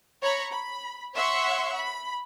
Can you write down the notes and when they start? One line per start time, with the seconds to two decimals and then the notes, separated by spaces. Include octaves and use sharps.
0.22 C#5 A#5 B5
0.52 B5
1.14 C#5 E5 F#5 C6 C#6
1.74 B5